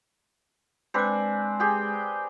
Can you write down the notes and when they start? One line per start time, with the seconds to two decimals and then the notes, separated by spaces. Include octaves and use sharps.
0.94 G#3 C4 D4 B4 G#5
1.60 G4 G#4 G5